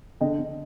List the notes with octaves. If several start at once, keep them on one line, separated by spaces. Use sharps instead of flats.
D3 D#5 G5
D3